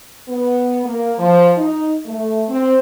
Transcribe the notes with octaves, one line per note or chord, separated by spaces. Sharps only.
B3
A#3
F3
D#4
A3
C4